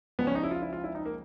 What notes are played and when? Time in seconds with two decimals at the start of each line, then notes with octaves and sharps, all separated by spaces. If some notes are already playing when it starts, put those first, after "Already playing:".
0.19 C#2 C#3 F3 G#3 B3
0.27 C#4
0.35 D#4
0.43 E4
0.51 F4
0.62 E4
0.73 F4
0.84 E4
0.95 D#4
1.05 A#3